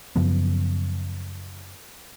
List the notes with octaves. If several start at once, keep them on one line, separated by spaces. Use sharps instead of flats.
F#2 C#3 F3 B3